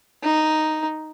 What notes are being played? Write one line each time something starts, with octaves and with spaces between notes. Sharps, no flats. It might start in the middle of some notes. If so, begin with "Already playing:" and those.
D#4